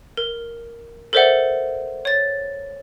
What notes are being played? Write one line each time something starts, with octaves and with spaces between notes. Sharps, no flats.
A#4
A4 A#4 C5 D5 E5 F#5
C#5 A6